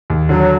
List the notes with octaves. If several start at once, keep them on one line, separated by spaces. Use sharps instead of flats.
D#2
D3 F#3